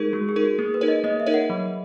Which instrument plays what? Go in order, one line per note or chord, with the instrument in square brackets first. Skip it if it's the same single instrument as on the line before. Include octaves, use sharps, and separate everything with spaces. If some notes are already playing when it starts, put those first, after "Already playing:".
Already playing: [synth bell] G#3 D#4 A#4 [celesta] G#4
[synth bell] G#3 [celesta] F#4
[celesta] G#4
[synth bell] D#4 A#4
[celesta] F#4
[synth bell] A#3 [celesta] G#4
[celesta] B4
[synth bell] D#4 A#4 C#5
[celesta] D#5
[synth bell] A#3 [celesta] D#5
[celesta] E5
[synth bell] D#4 A#4 C#5
[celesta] F#5
[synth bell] F#3